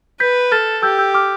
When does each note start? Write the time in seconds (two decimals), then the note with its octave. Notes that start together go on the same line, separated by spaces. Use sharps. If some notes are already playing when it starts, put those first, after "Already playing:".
0.20 B4 G6 B6
0.52 A4 F6 A6
0.83 G4 E6 G6
0.99 E6 G6
1.14 D6 F6